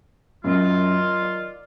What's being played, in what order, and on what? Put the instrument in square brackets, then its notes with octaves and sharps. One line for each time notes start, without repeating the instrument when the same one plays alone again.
[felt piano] F#2 [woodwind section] D#3 F#3 F4
[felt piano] D5